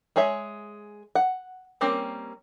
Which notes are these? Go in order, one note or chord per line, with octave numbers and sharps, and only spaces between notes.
G#3 G#4 C#5 E5
F#5
G3 A#3 C4 C#4